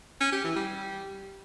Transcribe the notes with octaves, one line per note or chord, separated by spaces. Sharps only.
C#4
G4
E3
G3